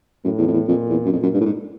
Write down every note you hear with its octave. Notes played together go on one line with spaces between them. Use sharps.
F#2 A2
E2
F2
E2
F2 A#2
E2
F#2
F2 A#2
F#2
G2
A2
G#2